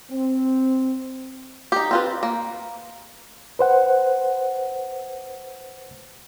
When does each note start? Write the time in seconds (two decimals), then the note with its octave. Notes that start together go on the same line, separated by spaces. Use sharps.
0.10 C4
1.72 D#4 G4
1.91 C4 F4 B4
2.23 A#3
3.59 B4 C5 F#5